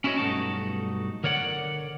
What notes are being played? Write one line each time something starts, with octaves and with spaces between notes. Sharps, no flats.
C#4 E4 F#4 G4 C#5 D#5
B1 G2 A3 D#4 F#4 A5
D3 A#4 C#5 D5 F#5